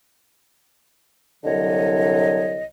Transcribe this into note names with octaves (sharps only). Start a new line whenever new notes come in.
C2 D3 F#3 C#5 D#5